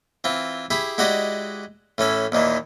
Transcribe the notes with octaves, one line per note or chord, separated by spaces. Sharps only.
E3 C4 F4
E4 G4 G#4 B5
G#3 E4 F#4 G4 D5 D#5
A2 E3 C#4 A4
D#2 A#2 D#3 E3